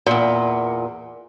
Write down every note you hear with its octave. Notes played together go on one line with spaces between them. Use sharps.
E2 A#2